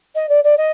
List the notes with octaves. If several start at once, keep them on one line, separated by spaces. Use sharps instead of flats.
D#5
D5
D5
D#5